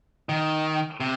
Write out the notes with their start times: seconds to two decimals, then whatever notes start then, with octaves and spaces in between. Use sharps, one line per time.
0.29 D#3
1.00 C3